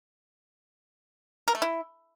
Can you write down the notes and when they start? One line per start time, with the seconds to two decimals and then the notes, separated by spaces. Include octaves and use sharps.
1.48 A#4
1.55 A3
1.62 E4